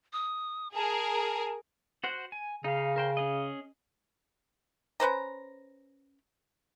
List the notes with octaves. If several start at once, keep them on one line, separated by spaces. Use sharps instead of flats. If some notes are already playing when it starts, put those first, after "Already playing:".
D#6
G#4 A#4 A5
F#4 C5 F#5
G#5
C#3 D#4 F5
A#4 C5 G5
C#4 G#4 D#5
C#4 B4 C5 A#5